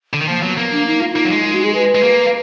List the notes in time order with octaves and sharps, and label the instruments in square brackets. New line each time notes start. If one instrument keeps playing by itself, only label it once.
[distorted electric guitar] D3
D#3
[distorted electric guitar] F3 [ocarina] A#3
[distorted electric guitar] F#3 [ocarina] B3
[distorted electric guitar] A#3 [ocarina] B3
[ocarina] D4
D#4
F4
[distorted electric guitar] A#3 [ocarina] D#4
[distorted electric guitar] F#3
G#3
[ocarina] D#4
F#4
G#4
B4
[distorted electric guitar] G#3
A#3